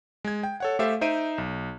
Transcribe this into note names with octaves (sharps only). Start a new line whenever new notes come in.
G#3 G#6
G5
A4 C#5 F#5
A3 G4 A4 C5 E5 F5
D#4 C5 E5 D7 D#7
B1